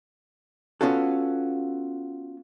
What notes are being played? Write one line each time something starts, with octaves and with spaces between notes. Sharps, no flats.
B3 C#4 F4 F#4 A4